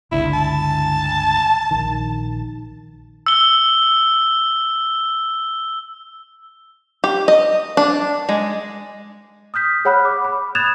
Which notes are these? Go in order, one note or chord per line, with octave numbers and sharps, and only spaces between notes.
G1 C#2 D3 E4
A5
A#1 D#3
E6 G7
G4
D#5
D4
G#3
D#6 F6 G6 B6
G#4 C#5 F#5 B5 F6 F#6
D6
B5
D#6 F#6 G#6 A6 E7 F7